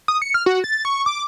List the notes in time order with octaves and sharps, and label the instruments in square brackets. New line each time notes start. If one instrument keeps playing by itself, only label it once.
[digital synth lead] D#6
C#7
F6
F#4
A6
C#6
D6